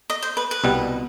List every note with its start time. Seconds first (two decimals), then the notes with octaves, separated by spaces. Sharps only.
0.10 D#5
0.23 C5
0.37 B4
0.51 B4
0.64 C2 B2 G3 B3